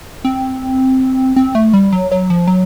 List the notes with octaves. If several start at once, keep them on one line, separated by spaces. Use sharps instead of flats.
C4
C4
A3
G3
F#3
F#3
F3
F#3